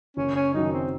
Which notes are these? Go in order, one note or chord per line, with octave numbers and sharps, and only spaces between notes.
F#1 C#4
C#4
F#2 D#3 F#3 D#4
C4